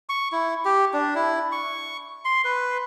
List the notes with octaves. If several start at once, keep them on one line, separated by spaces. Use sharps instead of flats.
C#6
E4
G4
D4
E4
C#6
C6
B4